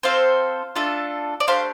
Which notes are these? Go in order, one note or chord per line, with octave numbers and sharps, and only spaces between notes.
C4 F4 A4 C5 F5
A3 D4 F4 A4
D5
A3 D4 G4 C5 F5